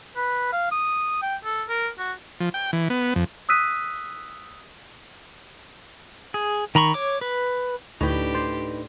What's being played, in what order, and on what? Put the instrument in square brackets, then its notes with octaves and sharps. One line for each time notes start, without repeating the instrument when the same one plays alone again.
[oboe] B4
F5
D#6
G5
A4
A#4
F#4
[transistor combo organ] F3
G5
E3
B3
F2
[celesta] D#6 E6 F#6 B6 D#7
[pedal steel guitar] G#4
D#3 A#5 B5 C#6
C#5 D6
B4
[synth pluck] D2 [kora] A2 G5 [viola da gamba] D4 G4 [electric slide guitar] D#4 B4
[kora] C5 D5